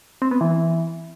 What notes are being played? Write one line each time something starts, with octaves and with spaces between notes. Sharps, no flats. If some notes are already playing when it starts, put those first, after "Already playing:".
C4
B3
E3